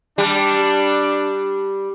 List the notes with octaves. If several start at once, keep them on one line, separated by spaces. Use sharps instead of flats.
G3 D4